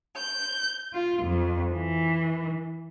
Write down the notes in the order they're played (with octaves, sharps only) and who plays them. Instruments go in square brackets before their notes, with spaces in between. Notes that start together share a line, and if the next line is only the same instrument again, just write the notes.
[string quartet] G6
F4
F2
E3